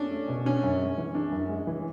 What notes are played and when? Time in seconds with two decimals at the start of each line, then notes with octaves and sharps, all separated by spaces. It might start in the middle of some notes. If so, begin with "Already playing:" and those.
Already playing: C#4 D4
0.11 A3
0.28 B2
0.45 C#4 D4
0.63 F#2
0.80 G#3
0.98 E3
1.15 D4
1.32 F#2
1.49 G#3
1.67 E3